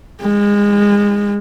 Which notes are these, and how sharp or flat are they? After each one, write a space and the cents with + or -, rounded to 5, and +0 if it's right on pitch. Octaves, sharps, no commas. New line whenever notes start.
G#3 -25